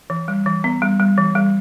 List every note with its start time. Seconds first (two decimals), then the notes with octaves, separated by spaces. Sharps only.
0.10 E3
0.28 G3
0.46 E3
0.64 B3
0.82 G3
1.00 G3
1.17 E3
1.35 G3